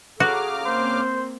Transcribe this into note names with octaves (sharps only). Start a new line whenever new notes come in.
C#3 F#4 G#4 A4 A#5 D6 F6
A#3 C4 C5